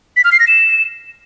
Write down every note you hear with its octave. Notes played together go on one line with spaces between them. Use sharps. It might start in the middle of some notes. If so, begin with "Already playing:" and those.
B6
F6
C7
A#6
E7